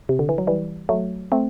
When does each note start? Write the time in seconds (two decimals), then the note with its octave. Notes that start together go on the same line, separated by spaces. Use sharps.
0.09 C3
0.19 D3
0.29 E3
0.38 F#3
0.47 E3 G3
0.89 F#3 A3
1.32 A3 C4